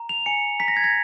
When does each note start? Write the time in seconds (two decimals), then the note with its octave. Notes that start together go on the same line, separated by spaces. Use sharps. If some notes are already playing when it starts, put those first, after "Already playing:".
Already playing: A#5
0.09 F7
0.26 G#5 C#7
0.60 A#5 B6
0.68 A#6
0.77 G#6
0.84 A#6